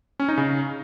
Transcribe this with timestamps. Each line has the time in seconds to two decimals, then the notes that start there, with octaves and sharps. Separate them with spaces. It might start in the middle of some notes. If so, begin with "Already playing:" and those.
0.20 C#4
0.29 D#4
0.38 C#3